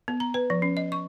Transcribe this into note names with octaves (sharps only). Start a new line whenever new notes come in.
B3
A#5
B4
F3
C#4
D#5
C#6